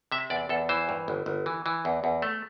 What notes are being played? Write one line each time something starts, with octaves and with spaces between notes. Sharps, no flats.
C3 E5
E2 D5
E2 A4
E3 C5
G2
G1
G1
E3
E3
E2
E2
A3